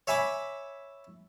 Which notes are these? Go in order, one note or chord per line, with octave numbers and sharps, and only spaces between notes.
C#5 E5 G#5 B5 D6